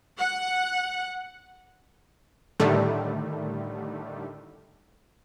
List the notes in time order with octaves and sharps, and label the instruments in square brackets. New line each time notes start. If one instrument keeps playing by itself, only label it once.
[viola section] F#5
[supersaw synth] A2 D3 D#3 G3 A3